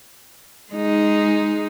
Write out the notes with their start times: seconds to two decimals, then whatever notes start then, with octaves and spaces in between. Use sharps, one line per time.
0.73 G#3 D#4